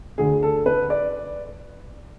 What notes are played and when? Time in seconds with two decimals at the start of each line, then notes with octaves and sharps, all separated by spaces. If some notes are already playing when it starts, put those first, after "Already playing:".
0.18 D2 D3 G#4
0.43 A4
0.66 B4
0.90 D5